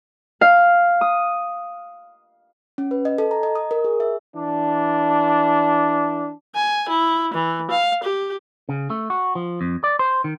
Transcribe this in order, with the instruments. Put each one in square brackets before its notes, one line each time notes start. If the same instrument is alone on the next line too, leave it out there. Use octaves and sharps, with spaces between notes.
[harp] F5
D#6
[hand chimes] C#4
B4
D#5
A4
A#5
D#5
D#6
A#4
G#4
E5
[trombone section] E3 D4
[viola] G#5
E4
E3
F5
G4
[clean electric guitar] C#3
A3
F#4
F3
F2
D5
C5
D#3